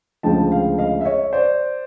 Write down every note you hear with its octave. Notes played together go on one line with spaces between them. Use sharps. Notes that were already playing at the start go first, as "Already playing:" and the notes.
D2 C#3 F3 G#3 G5 A5
F5 G5
D#5 F5
E5
C#5 D#5
C5 D5